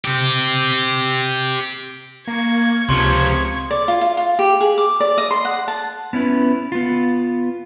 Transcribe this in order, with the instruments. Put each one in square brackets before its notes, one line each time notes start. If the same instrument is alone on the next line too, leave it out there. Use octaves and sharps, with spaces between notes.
[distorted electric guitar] C4 G4
[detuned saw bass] A#3 [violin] C#6 G#6
[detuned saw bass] C#2 [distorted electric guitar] C3 F3 [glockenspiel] C6
[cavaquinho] D5
F4
F4
F4
G4
G#4
D6
D5
D#5
C6
F#5
A5
[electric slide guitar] B3 C#4 E4 B4
B3 F4